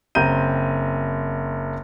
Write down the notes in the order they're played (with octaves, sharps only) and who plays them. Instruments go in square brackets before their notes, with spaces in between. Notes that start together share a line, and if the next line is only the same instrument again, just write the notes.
[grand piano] F#1 C4 A#5 G6 D#7